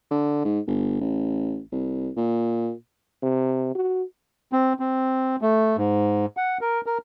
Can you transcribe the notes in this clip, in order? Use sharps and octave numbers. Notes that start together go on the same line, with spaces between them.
D3
G#2
G1
A1
C2
A#2
C3
F#4
C4
C4
A3
G#2
F#5
A#4
A#4